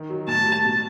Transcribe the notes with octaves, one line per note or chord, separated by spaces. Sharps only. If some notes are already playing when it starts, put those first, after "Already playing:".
Already playing: D#3
F#3
A2 A5
G3
B2